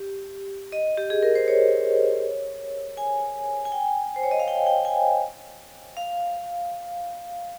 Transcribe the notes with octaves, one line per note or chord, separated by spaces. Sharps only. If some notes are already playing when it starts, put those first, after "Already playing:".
Already playing: G4
D#5
G4
G#4
A#4
C5
C#5
G#5
G#5
G5
C5
C#5
D#5
F5
G5
G5
G#5
F5